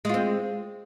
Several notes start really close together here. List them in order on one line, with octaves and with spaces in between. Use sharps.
G#3 F4 C4